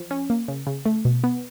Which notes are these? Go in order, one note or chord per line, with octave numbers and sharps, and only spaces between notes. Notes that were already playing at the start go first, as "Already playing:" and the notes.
Already playing: F3
C#4
A#3
C#3
C#3
A3
B2
B3